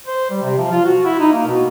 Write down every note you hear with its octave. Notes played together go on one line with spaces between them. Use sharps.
C5
G3
C3
F3
F4
F#4
E4
D#4
A#3
B2